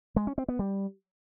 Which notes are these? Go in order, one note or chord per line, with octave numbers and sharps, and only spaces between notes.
G#3
C#4
C4
B3
G3